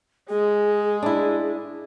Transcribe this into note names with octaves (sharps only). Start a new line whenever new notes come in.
G#3 G#4
D4 E4